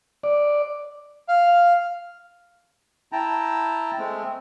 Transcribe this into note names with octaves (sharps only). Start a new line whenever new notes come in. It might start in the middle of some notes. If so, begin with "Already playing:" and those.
D5
F5
E4 G5 A5 A#5
G#3 A3 C4